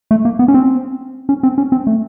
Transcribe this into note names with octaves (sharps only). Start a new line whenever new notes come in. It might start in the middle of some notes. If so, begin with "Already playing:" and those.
A3
A#3
B3
C#4
C4
C#4
C4
C#4
C4
A3